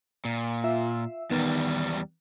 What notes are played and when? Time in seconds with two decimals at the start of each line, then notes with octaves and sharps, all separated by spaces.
0.25 A#2
0.64 F4 E5 E6
1.30 E2 D#3 G3 B3